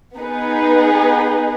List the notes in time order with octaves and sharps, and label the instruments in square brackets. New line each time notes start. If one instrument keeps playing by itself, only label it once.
[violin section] B3 D#4 G#4 B4